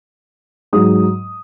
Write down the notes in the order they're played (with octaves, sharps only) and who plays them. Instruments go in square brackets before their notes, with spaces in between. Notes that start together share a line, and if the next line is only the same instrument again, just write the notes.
[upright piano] G#2 F#3 D#6